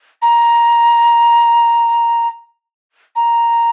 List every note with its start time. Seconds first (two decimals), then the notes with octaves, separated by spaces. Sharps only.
0.22 A#5
3.15 A#5